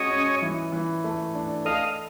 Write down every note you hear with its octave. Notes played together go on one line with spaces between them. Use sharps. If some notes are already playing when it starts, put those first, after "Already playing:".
Already playing: G#3 C#4 F#4 C#5 D#5
C#4
E3
E3
A3
D4
A4 D#5 F5